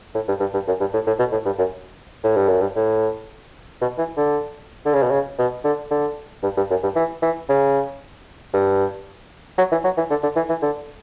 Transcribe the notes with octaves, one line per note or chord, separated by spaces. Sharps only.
A2
G2
G2
G2
F#2
G2
A2
A2
B2
A2
G2
F#2
A2
G2
F#2
G2
A2
B2
E3
D3
D3
C#3
B2
C#3
B2
D3
D3
G2
G2
F#2
G2
E3
E3
C#3
G2
F#3
E3
F#3
E3
D3
D3
E3
E3
D3